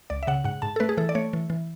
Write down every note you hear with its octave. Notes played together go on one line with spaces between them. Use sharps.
C#2 D5
E5
C#3 F#5
G#2 F#5
G#2 A5
A4
A3 B4
G#4
E3 A4
D5
A3 C#5
E3
E3